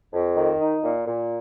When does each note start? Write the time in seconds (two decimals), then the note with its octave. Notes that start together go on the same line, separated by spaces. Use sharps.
0.12 F2
0.36 D#3
0.59 D#4
0.83 A#2
1.06 A#2